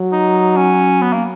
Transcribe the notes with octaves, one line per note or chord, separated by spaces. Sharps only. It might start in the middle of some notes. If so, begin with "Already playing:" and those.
Already playing: F#3
D#4
C#4
B3
A#3